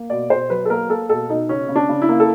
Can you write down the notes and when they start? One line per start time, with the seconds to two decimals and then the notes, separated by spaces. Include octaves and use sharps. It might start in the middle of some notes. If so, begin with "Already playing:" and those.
Already playing: A#3
0.10 B2 D5
0.30 B2 C5
0.50 F#3 B4
0.65 A4
0.70 A#3 A#4
0.89 A#3 A4
1.09 B2 A4
1.29 B2 D#4
1.49 C#3 C#4
1.69 C#3
1.76 D4
1.89 C#3
2.02 E4
2.09 A#3
2.20 A4